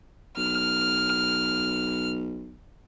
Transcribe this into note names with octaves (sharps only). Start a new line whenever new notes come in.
B1 F6